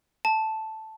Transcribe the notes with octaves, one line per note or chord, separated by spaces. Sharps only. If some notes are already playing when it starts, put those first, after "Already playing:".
A5